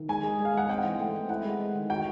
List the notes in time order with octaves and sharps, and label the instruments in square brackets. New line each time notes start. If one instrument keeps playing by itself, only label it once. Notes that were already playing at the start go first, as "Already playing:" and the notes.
Already playing: [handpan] D#3
[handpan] G#3 [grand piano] G#5
[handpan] G#4
G#3
[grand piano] F5
[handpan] G#3 [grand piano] F#5
[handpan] C4 [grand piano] G5
[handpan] E3
A3
C4
[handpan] E4 [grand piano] F#5
[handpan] G#3
G#3
D#3
[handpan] F#4 [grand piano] G5